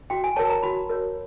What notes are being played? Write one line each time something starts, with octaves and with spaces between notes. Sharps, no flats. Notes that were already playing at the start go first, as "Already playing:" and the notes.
F#4 G5
G#5
A#4 C#5 A5
A#5
F#4 B5
A#4 C#5